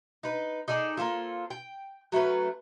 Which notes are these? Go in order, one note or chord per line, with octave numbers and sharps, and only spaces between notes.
D#4 B4
D#4 G#4 A4 D5
A#3 C4 F4 A4
G5
F#3 A3 C#4 B4